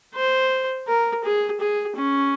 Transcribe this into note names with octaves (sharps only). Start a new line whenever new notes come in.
C5
A#4
G#4
G#4
C#4